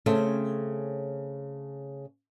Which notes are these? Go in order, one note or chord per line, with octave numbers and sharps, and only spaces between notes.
C#3 A3 C4 C#4